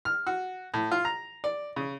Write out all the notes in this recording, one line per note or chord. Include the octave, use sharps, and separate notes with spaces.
F6
F#4
A2
F4
A#5
D5
C#3